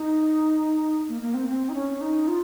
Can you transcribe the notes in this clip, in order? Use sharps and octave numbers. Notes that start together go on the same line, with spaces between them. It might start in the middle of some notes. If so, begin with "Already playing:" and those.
Already playing: D#4
A#3
A#3
C4
C4
D#4
C#4
D#4
F4